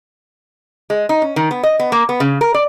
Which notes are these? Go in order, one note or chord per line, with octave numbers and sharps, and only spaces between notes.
G#3
D#4
C#4
D#3
B3
D#5
B3
A#3
B3
C#3
A#4
D5